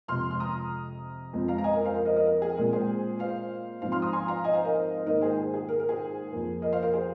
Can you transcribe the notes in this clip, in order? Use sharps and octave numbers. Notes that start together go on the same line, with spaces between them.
F2 C3 G#3 C6 F6
F6
A#5 D#6
F2 F3 G#3 C4
F5 A#5
A#5
D#5 G#5
A#4
C5 F5
A#4
A#4 D#5
A#4 D#5
A#4
G#4
A#2 G#3 C4 A#4
G#4 C5
C5 F5
G#2 F3 C4 C5 F5
C6 F6
A#5 D#6
G#5 C6
F5 A#5
D#5 G#5
C5 F5
A#4 D#5
C5
G#2 D#3 A#3 A#4 D#5
G#4 C5
G#4
G#4
A#4
A#4
G#4 C5
F2 F3 A#3
A#4 D#5
C5 F5
A#4
G#4 C5